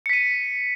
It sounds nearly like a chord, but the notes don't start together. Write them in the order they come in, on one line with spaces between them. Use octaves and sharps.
C#7 B6 D#7